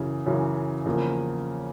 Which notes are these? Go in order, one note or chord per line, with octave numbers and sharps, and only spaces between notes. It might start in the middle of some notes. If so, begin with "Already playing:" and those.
Already playing: F#2 C#3 E3
F#2 C#3 E3
E2 C#3 F3 A#3